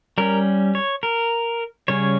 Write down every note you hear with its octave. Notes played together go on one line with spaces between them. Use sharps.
G3 C#4 A#4
C#5
A#4
C#3 G3 C#4 C#5